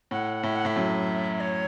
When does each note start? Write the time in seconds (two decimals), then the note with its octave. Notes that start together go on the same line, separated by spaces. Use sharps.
0.11 A2 F#5
0.43 A2 E5
0.56 F#5
0.65 A2 E5
0.76 F#2
1.40 C#5